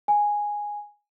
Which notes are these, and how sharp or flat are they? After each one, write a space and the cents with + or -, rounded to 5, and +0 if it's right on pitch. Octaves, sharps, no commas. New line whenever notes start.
G#5 -5